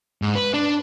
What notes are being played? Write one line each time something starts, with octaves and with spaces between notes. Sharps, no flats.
G#2
B4
D4